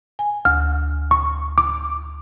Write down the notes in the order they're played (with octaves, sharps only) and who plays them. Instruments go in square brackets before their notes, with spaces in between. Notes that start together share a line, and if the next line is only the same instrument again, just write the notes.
[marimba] G#5
[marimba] D2 [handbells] F6
[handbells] C#6
D6